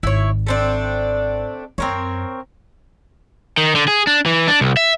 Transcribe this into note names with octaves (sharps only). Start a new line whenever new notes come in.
G#1 E4 C#5
A3 C4 D4
F#2 C4 A#4 C#5
D#3
D3
G#4
D4
E3
D4
C2
E5